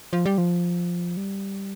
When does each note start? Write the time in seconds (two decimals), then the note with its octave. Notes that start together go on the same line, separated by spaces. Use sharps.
0.13 F3
0.26 G3
0.38 F3
1.17 G3